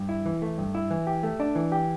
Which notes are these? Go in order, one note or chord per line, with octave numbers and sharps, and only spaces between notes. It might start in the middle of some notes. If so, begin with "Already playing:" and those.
Already playing: G2
E4
E3
A3
G2
E4
E3
G4
A3
D4
E3
G4